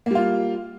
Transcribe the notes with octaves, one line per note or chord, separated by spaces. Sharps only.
G3 A#3 F4